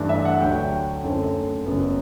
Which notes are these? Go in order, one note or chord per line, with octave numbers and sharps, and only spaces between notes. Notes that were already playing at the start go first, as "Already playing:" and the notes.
Already playing: G2 E3 A3 D4
E5
F#5
D2 D3 F#3 G5
F#2 D3 A3 C4
F#1 F#2 F#3 B3